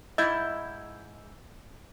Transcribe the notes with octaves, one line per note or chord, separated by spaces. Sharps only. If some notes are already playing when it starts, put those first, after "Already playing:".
G#2 E4 D#5 E6 G6 G#6